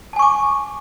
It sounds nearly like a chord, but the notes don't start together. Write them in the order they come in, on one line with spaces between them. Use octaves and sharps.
A5 G#5 C#6 D6